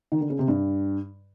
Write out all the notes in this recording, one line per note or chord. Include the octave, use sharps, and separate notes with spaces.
D#3
D3
C#3
C3
G2